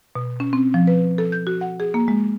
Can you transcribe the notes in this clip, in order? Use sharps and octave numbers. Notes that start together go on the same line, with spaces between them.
B2
C#4
C4
F3
B4
A4
G6
F#4
F#5
G#4
A#3
G#3